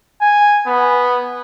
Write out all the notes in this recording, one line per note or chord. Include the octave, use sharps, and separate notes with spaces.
G#5
B3